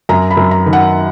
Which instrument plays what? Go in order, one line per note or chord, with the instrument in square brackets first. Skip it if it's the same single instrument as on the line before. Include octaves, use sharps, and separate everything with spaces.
[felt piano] F#2 A#5
B5
F#2
A#5
D#3
F#5